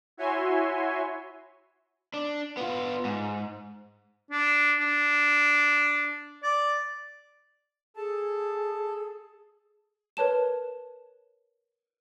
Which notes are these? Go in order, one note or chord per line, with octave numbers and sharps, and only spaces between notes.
E4 F#4 C#5 E5 G#5 C6
D4
B3 F4
G#2
D4
D4
D5
G#4 A4 A5
A#4 B4 C#5 A5 E7